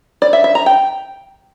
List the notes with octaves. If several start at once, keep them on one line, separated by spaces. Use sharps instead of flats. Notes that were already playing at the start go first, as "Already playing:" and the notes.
D5
E5
E5
A#5
G5